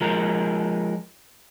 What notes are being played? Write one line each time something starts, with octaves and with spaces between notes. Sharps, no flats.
F3 G#3 A#4